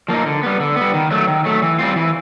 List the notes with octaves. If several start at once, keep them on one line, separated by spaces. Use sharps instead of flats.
F3 A#3 D#4
D3
G3 B3
D3
G3 B3
D#3
F#3 A3
D#3
F#3 A3
E3
G3 C4 F4
E3